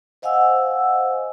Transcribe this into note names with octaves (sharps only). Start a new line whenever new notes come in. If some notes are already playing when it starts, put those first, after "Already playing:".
C5 D#5 F5 F#5 G#5 E6